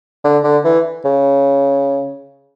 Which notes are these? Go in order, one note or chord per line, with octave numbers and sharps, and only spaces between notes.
D3
D3
E3
C#3